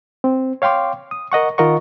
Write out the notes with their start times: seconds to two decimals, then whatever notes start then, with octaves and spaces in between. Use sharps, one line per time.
0.24 C4
0.62 C#5 F5 G5 C6 D6
1.11 D#6
1.32 A#4 D#5 F#5 C#6
1.58 D#3 F4 A#4 D#5 F#5 C#6